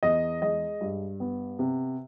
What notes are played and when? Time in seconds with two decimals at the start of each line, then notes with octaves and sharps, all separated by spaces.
0.03 E2 D#5
0.42 G#3 D#5
0.81 G2
1.20 B3
1.59 C3